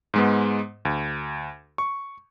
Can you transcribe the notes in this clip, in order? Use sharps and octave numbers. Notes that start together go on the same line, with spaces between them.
G#2 G#3 B3
D2
C#6